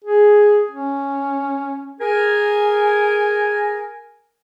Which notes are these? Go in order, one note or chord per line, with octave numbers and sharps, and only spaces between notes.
G#4
C#4
G#4 A#4 G#5